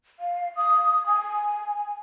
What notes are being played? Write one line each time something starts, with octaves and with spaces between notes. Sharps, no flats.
F5
D#6
G#5